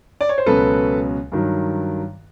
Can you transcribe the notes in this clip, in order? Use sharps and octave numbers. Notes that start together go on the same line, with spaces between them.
D5
C#5
C5
C#2 B2 F#3 A4 B4
G2 D#3 F#3